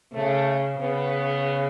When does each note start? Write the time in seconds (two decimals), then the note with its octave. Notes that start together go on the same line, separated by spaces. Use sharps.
0.13 C#3 A3
0.80 C#3 B3